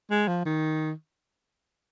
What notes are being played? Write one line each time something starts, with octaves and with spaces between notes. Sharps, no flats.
G#3
F3
D#3